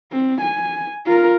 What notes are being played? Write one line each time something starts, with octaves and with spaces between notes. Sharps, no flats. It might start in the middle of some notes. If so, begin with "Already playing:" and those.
C4
G#5
F4 A#4